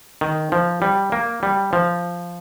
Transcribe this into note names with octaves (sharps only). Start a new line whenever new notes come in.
D#3
F3
G3
A#3
G3
F3